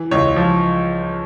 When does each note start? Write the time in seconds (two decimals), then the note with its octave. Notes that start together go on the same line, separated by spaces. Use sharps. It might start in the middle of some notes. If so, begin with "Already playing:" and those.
Already playing: E3
0.11 C#2 C#5
0.36 F3